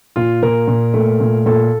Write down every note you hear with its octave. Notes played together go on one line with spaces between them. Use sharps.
A#2 F4
A#2 A#4
A#2
A3
A#2
A#2 A4